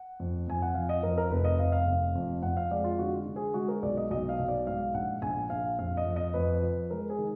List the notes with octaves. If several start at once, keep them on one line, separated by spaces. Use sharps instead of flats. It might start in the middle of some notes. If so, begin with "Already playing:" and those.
Already playing: F#5
F2
F2 G#5
F#5
F3 F5
D#5
F2 A#4
A#4
F1 B4
D#5
F1 F5
F5
F1
F2
F2 F#5
F5
G#3 D5
F4
D3 F#4
D3
G#4
G#3 F#4
A#4
B1 D5
D#5
B1 D#5
F5
B1
D5
G#2 F5
A#1 F#5
A#1 G#5
A#1 F5
F2 F5
D#5
F2
D#5
F2 B4
F3
G#3 A#4
G#4
D#3